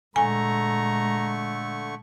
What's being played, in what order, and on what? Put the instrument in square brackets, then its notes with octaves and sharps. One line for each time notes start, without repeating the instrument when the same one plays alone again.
[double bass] A#2 G#3 [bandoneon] D3 A3 C#6 [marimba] G#5 [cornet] A#5